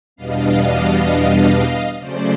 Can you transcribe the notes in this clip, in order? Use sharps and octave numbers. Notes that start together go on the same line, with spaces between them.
E2 B2 G3 B3 D4 D#5 F5
C#3 F#3 A3 C#4 C5 D5